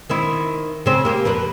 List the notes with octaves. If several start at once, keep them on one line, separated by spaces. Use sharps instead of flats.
D#3 C4 E4
C#3 C4
A#3 G4
F2 A#4 B4